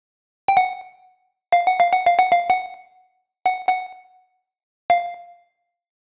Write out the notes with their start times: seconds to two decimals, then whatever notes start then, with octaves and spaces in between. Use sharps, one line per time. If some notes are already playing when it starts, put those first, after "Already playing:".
0.48 G5
0.57 F#5
1.52 F5
1.66 F#5
1.80 F5
1.93 F#5
2.06 F5
2.19 F#5
2.32 F5
2.50 F#5
3.46 F#5
3.69 F#5
4.90 F5